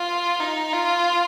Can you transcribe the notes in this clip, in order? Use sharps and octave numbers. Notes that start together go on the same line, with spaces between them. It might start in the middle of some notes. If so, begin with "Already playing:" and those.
Already playing: F4
D#4
F4